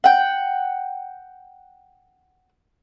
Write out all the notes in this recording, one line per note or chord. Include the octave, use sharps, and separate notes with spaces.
F#5 G5